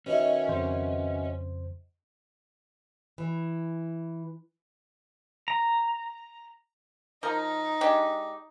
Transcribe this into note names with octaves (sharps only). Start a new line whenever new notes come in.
B2 D#3 C#4 E4
F2 C#3 C5
E3
A#5
F3 D#4 A#4
G#3 D4 G4